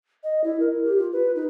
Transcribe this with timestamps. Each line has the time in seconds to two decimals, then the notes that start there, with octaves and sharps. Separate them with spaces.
0.23 D#5
0.44 E4
0.60 A#4
0.84 G4
0.98 F4
1.13 B4
1.35 D#4